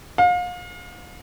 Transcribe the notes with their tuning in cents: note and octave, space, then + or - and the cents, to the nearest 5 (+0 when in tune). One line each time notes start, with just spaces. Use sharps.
F5 +35